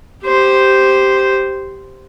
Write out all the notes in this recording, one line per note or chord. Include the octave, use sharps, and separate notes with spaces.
G4 C5